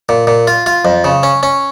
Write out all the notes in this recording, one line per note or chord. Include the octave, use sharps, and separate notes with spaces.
A#2
A#2
F4
F4
F2
C#3
C#4
C#4